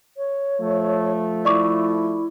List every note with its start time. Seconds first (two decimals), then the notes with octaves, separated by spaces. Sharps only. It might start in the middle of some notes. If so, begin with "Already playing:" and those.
0.17 C#5
0.60 F3 A3
1.45 E4 D5 C#6 D6